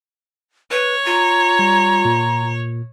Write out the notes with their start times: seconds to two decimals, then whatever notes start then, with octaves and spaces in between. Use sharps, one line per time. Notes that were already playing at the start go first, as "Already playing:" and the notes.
0.71 B4 C#5
1.05 F4 A#5
1.59 G3
2.05 A#2